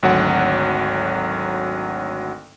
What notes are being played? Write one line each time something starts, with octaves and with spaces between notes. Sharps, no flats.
G#1 D2 F#3 F#5